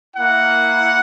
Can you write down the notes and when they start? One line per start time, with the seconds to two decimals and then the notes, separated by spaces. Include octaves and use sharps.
0.15 A#3 E4 F#5